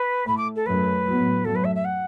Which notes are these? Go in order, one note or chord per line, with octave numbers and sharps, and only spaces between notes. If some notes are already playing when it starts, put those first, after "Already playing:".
Already playing: B4
A2 A3 B5
D6
A4
F#2 F#3 A3 B4
A2 F#3 B3
F#2 F#3 A3 A4
B4
E5
E5
F#5